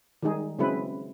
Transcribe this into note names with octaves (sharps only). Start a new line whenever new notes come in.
D#3 G3 G#3 D#4 G#4
C#3 F#3 G#3 C4 E4 B4